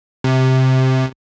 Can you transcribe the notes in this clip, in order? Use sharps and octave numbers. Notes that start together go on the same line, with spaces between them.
C3